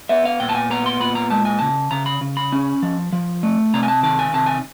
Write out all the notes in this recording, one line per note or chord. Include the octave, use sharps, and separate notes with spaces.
B3 E5
F5
A#2 G5
A5
G#5
B3 A#5
C6
A#2 B5
A#5
G#3 A5
G#5
C#3 A5
C#3 A#5
B5
C#3
B5
C#4
F3
F3
A3
C3 A#5
G#5
A5
D#3 A5
G#5
C3 A5
G#5